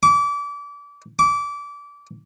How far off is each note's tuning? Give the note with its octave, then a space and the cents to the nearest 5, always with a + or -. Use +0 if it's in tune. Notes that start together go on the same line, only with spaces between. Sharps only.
D6 -30
D6 -25